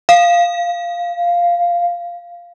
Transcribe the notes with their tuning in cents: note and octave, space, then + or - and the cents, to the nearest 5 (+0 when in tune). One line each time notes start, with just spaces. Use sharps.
F5 -5